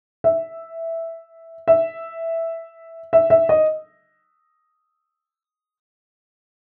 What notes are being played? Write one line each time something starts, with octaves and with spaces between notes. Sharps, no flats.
E5
E5
E5
E5
D#5